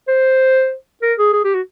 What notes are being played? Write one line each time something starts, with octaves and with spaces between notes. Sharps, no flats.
C5
A#4
G#4
G#4
G4
F#4